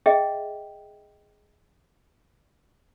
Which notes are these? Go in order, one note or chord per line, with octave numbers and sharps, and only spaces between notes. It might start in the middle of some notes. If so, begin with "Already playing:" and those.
G#4 D#5 E5 G5